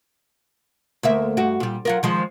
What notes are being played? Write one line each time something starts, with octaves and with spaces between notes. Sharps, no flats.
D2 A#3 E5
G2 F#4
A#2 G3
F#3 F4 A#4
D#3 F3 G#3